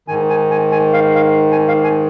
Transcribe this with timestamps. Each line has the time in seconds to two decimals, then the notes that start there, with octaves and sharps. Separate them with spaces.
0.08 G#2 D#3 G#5
0.29 G#5
0.51 G#5
0.72 G#5
0.94 F5
1.15 F5
1.52 G#5
1.68 F5
1.84 G#5